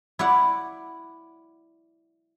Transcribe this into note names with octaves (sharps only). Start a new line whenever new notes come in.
E4 C#5 D5 F#5